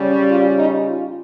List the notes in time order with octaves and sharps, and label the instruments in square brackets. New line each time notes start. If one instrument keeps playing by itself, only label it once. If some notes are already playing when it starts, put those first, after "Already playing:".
Already playing: [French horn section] C#3 G3 C#4
F4
D#4
F4